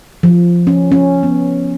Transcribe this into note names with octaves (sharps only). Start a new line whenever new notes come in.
F3
C#4
C#4
B3